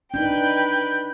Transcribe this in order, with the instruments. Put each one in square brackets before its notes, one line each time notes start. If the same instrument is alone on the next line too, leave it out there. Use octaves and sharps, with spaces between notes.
[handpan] D4 D#4 [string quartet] B4 G5 [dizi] G6